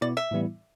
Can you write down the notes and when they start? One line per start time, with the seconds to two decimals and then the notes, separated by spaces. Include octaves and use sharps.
0.01 B2 B3 E4 D5
0.17 E5
0.31 A2 E3 G3 B3 E4